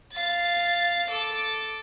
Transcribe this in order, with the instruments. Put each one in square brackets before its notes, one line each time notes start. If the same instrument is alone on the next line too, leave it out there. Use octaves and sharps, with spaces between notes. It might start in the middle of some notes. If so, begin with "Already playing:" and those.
[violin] F5 A6
A4 D6